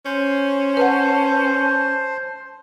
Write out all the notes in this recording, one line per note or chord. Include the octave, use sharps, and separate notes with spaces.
C#4 C5
B4 F#5 A5